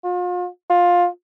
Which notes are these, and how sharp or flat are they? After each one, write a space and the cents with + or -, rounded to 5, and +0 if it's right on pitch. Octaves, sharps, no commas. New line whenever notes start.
F4 +40
F4 +15